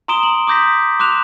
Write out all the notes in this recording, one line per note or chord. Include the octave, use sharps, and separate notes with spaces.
A#5 C6 D#6 D7 E7 G7
F#7
D6 D#6 G6 A#6 B6
C6 D6 F#6 E7 F7